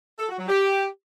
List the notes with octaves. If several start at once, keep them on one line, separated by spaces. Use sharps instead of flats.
A4
F#4
F#3
G4